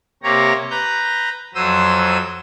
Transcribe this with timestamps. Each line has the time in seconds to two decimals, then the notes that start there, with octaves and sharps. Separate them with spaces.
0.23 C3 A#3 G4 C#5 A#5
0.70 B4 A#5 G6
1.55 F2 F#3 C5 D#6 E6